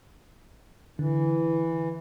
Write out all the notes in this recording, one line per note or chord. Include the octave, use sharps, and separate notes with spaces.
D3 E3